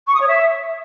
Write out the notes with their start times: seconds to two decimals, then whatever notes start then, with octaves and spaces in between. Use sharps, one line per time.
0.08 C#6
0.15 D#6
0.21 C#5
0.28 E5